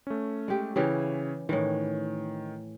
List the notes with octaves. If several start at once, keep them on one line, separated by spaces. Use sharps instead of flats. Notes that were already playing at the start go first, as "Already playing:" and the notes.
A3 C#4
G#3 G4
C#3 E3 C#4 E4 G4 C#5
A2 D#3 E3